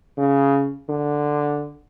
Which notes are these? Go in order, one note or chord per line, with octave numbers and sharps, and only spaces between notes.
C#3
D3